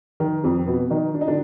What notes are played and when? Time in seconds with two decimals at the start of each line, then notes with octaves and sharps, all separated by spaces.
0.20 D#3
0.44 F2 F3
0.67 B2 B3
0.90 D#3 D#4
1.14 D4
1.21 D#4
1.28 D3 D4